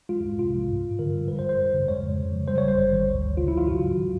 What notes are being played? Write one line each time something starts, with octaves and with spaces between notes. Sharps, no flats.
G#3 F4
C2
C3 F4
F3
G2
G2
D3 A#4
G3
G1 B4
C5
G1
C5
F#2
C#3
G#3 C#5
F2
C#3
F3
G3 C5
C#5
G#1
C5
G2
D#3
D2
D2
C#3 F4
E4
F#3
F4
G2 F#4
G2
D#3